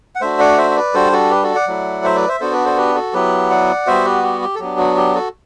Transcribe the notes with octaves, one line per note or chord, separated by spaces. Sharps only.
F#5
A3 D4 F#4 C5 E5
D5 F#5
C5 E5
E5
B4 D5
G3 D4 F#4 A4 C5
F#4 A4
G4 B4
F#4 A4
D5 F#5
F#3 A3 E4
C5 E5
B4 D5
C5 E5
B3 D4 F#4 A4 C5
B4 D5
A4 C5
G4 B4
F#4 A4
F#3 B3 E4 G4 B4
D5 F#5
G3 B3 F#4 C5 E5
G4 B4
G4
G4
A4
F#3 B3 D4 G4
F#4
G4
F#4 A4